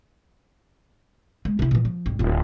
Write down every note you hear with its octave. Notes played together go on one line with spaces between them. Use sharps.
G#3
C3 E4
A#2 E3
F3
C2 G#2
D1 F4